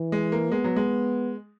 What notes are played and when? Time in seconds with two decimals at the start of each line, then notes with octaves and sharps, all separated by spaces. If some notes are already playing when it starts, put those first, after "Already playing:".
Already playing: E3
0.12 G#3
0.32 A#3
0.51 G#3 B3
0.64 F#3
0.76 G#3